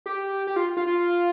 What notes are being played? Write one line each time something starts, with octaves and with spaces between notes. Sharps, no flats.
G4
G4
F4
F4
F4